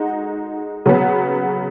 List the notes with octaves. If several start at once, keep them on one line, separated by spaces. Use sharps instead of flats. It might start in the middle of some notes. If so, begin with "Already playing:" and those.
Already playing: G#3 D#4 F#4
C#3 F#3 B3